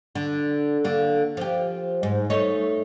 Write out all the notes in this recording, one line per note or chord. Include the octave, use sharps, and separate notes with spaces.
D3
D3 A#3
F3 G4
G#2
A3 D#4 C#5